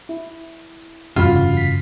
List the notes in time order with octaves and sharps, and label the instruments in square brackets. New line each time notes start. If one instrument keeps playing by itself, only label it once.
[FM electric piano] E4
[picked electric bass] F1 G2 C#3 [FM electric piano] E3 F#4 B5 [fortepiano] F4
[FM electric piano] B6